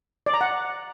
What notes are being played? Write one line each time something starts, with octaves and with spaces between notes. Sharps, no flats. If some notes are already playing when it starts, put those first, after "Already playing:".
D5
A#5
F#5